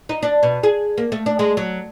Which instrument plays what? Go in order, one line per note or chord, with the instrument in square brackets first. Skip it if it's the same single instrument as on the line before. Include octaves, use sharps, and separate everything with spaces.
[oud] D#4
D4
B2
G#4
A#3
A3
D4
G#3
F#3